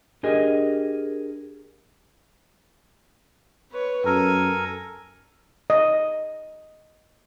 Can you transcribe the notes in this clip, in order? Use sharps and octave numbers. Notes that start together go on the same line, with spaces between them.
D4 G4 G#4 A#4 D#5 G#5
B4 C#5
F#2 A4 A#4 G#5 A#5
D#5